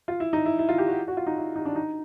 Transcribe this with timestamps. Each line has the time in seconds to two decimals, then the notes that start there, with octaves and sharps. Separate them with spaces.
0.08 F4
0.20 E4
0.33 D#4
0.46 E4
0.59 E4
0.69 F4
0.78 G4
0.88 F#4
1.08 F#4
1.17 F4
1.27 D#4
1.37 E4
1.56 D#4
1.65 D4
1.76 D#4